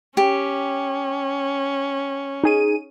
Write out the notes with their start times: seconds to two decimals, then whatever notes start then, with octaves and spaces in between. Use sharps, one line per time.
0.17 C#4 G4
2.44 D#4 G#4 D#7